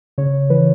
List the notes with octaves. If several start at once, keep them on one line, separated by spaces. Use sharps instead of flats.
C#3 C#5
E3 B4